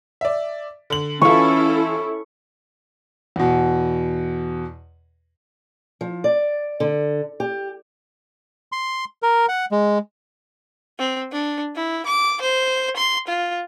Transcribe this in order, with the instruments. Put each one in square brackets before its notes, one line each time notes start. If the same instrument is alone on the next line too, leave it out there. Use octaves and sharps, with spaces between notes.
[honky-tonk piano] D5 E5
D3 F#7
[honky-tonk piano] E3 F4 [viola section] C#4 E4 A4 [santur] C#6
[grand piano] E2 B2
[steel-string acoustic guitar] F3
D5
D3
G4
[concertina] C6
A#4
F#5
G#3
[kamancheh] C4
D4
E4
D6
C5
C6
F4